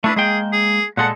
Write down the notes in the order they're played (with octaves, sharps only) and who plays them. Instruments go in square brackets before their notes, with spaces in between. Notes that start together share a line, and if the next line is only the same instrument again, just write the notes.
[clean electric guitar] A3 E4 B4 [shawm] D4
[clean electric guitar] G#3 A#3 G5 [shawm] G#4
[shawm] G#4
[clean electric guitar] A#2 G#3 A4 [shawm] F#5